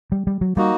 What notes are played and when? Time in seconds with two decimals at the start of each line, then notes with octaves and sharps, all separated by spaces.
0.12 G3
0.27 G3
0.41 F#3
0.57 G3 A#3 D#4 F#4